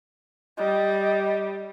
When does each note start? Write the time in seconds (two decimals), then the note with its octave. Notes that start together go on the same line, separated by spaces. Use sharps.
0.58 G3 D#5